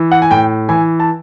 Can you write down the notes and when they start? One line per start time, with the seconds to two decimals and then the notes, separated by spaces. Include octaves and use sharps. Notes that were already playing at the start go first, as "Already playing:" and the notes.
Already playing: E3
0.12 F#5
0.22 G#5
0.31 A2 G5
0.69 E3 G#5
1.00 A5